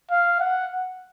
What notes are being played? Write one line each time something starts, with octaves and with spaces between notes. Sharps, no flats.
F5
F#5